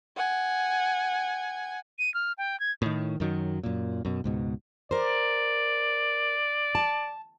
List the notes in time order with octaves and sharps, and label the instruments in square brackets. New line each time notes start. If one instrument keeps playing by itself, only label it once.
[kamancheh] F#5 G#5
[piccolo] D#7
F6
G5
G#6
[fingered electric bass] A2 D#3
F#2 D#3 F#3
F#2 A#2
F#2 B2
C#2 G#2 B2
[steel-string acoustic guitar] A#4 C5 [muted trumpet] D5
[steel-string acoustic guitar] A5